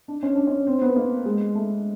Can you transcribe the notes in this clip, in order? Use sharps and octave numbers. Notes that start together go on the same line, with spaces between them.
D4
C#4
D4
C#4
C4
B3
A#3
G#3
A3